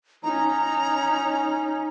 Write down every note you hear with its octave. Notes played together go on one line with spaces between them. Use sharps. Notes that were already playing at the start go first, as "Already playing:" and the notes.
C#4 D#4 A#5